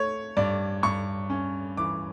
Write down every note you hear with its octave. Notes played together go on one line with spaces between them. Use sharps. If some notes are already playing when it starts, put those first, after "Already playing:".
Already playing: A3 C#5
G2 D5
G2 C#6
C#4
E3 D6